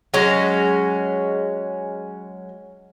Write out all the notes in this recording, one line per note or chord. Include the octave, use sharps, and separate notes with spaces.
F#3 G#3 C#4